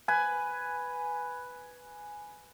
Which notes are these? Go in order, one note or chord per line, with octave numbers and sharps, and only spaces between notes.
B4 G#5